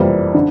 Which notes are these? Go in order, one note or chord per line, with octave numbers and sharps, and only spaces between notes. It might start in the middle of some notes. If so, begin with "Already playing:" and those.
Already playing: F1 F2 E3 G3 A#3
D3